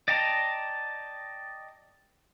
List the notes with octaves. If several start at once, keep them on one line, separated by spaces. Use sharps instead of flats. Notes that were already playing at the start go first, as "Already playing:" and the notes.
D5 D#5 G5 A5 A#5